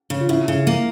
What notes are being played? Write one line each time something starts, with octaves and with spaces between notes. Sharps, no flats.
C#3
F4
C#3 E4
C#3
A#3